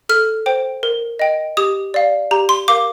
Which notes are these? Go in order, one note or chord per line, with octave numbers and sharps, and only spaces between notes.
A4 F6
C5 G5
A#4
D#5 G5
G4 D#6
D5 F5
G4 A#5
C6
A#4 F5 D6